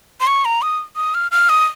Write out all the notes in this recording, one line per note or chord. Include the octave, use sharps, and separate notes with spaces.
C6
C#6
A#5
D#6
D#6
F6
F6
D#6